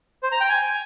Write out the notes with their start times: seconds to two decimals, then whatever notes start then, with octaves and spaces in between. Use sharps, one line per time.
0.23 C5
0.32 A#5
0.40 G5
0.49 G#5